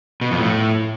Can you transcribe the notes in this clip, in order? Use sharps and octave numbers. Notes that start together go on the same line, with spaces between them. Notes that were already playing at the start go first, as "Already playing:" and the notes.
B2
F2
A2